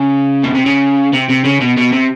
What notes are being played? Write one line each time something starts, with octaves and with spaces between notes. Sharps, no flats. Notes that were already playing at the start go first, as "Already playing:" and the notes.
Already playing: C#3
B2
C3
C#3
C3
C3
C#3
B2
B2
C3